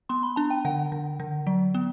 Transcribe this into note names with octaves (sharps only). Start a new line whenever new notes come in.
B3 C6
B5
D4 A5
G5
D3 F#5
D3
D3
F#3
B3